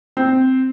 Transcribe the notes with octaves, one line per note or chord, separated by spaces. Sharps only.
C4